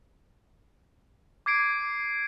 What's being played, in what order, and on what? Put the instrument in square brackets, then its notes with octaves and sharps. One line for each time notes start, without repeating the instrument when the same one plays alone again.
[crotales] D6 G#6 C7 D7